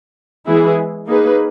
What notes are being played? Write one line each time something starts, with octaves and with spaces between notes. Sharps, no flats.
E3 G#3 B3 E4 G#4
A#3 D#4 G#4 B4